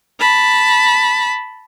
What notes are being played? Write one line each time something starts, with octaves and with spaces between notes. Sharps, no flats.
A5 B5